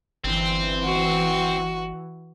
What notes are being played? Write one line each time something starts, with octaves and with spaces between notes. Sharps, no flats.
G1 E3 C4
F#4